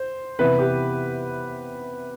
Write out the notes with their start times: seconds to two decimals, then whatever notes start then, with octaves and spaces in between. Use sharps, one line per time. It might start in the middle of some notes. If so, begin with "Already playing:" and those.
Already playing: C5
0.39 C3 E3 B3 E4 B4
0.59 G4